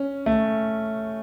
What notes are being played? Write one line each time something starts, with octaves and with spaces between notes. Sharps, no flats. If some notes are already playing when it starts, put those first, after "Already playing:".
Already playing: C#4
A3